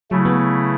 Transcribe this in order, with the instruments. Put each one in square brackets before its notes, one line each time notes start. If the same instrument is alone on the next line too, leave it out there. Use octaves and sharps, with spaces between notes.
[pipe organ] C#3 A3 E4 [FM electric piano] F#3
[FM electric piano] F#3 B3